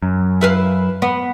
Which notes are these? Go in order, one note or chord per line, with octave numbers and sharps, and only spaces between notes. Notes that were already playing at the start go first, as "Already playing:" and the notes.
F#2
E4 B4 F5
B3